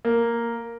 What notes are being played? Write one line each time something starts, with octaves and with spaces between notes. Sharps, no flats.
A#3